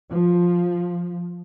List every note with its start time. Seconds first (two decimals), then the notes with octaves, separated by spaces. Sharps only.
0.10 F3